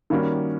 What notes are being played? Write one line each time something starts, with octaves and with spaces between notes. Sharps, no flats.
D#3 G3 A#3 C#4 F#4